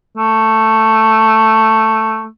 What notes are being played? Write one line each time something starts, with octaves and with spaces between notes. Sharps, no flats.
A3